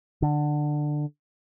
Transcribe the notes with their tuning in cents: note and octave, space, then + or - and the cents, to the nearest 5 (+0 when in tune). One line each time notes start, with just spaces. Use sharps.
D3 +15